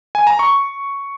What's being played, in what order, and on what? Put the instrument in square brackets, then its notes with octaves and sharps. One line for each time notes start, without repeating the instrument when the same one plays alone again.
[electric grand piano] G#5
A#5
C#6